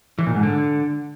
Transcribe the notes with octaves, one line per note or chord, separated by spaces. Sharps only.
E3
A#2
G#2
D3